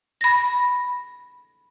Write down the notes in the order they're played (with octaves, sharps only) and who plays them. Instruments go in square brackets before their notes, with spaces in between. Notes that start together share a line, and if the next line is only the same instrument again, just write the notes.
[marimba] B5 A#6